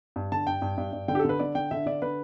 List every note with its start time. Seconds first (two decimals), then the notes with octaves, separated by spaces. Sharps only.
0.16 G2
0.32 D3 A5
0.46 G2 G5
0.62 G2
0.78 G2
0.93 G2
1.08 D3 G5
1.15 G4
1.19 A4
1.25 D3 B4
1.40 D3 D5
1.55 D3 G5
1.71 D3 E5
1.86 D3 D5
2.02 D3 B4